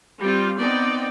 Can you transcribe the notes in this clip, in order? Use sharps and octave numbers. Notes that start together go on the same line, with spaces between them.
G3 C4 F4
B3 C4 D#4 D5 G5